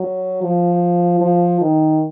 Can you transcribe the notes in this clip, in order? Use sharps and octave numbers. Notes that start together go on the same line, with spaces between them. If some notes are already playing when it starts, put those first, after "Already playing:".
Already playing: F#3
F3
F3
D#3